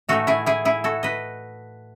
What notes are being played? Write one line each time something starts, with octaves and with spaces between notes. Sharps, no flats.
A2 E3 A3 D#4 F#4 A4
E4 G#4
E4 G#4
E4 G#4
F#4 A4
B4 D#5